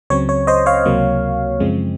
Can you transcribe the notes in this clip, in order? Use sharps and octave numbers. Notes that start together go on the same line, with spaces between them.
C#2 C#3 F#3 C4 C#5
C#5
C5 D#5
C#5 F5
C#2 C3 F#3 A#3
F#2 C#3 F3 G#3 C4